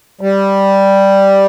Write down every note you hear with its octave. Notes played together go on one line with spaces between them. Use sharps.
G3